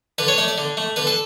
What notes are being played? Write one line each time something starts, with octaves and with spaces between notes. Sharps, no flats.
D3 B4
C#5
A3 D5
D5
D3
A3
D3 B4
A4